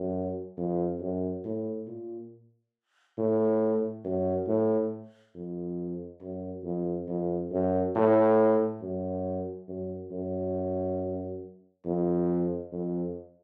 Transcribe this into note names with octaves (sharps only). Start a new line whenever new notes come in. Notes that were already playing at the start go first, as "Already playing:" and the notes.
Already playing: F#2
F2
F#2
A2
A#2
A2
F#2
A2
F2
F#2
F2
F2
F#2
A2
F#2
F#2
F#2
F2
F2